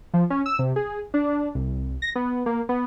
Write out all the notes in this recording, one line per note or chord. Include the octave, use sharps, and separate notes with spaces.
F3
C#4
E6
C3
G#4
D4
C2
A#6
B3
A#3
B3